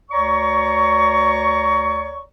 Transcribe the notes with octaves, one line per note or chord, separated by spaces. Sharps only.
D2 C#5 D5 A#5 C#6